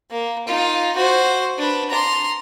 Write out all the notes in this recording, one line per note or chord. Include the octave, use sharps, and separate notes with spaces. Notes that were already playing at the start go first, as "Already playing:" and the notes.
A#3
D#4 F4
F#4 C5
D4 B4
A#5 C6